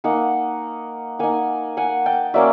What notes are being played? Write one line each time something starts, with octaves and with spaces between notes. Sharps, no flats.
A#3 D#4 F#5 G#5
A#3 D#4 F#5 G#5
F#5 G#5
G5 A5
F#3 A#3 C#4 D5 E5